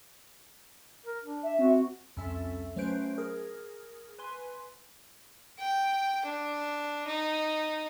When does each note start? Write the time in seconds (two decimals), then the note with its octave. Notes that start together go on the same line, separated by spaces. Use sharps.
1.06 A#4
1.24 D4
1.43 E5
1.59 C4 F#4
2.16 C2 F2 C#4 A4 E5
2.76 F#3 A3 C#4 B4 C5 D7
3.18 G#4 A#4
4.18 B4 G#5 C6
5.59 G5
6.25 D4
7.07 D#4